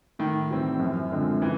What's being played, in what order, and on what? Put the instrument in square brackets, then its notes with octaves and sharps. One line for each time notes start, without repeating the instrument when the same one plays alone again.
[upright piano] A2 [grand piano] D#3
[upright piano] E3 G3 C4
F#2
D3 F3 G#3 C4
[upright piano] C#3 [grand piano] E3